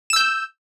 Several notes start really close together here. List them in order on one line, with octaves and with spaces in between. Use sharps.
E7 E6 G6